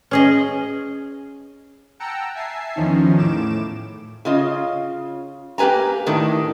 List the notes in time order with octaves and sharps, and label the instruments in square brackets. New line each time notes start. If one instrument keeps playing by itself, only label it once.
[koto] C#4 G#4 D#5
[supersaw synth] F#5 G5 A5 A#5 E6 C#7
E5 G#5 A5 C7
E2 D#3 F3 C#4 D#4
A2 D6 E7
[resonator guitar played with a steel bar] C#3 F4 D#5
A#3 G4 B4 G#5 A#5
A2 D#3 D4